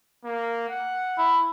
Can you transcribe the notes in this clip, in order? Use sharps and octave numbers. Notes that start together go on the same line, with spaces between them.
A#3
F#5
E4